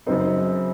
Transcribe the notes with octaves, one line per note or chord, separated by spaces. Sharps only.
F#2 C#3 F#3 C4 D#4